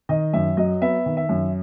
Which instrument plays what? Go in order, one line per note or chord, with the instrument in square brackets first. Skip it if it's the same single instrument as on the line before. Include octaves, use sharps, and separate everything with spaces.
[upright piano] D#3 D#5
F#2 E5
F#3 D#5
B3 E5
D#3
E5
F#2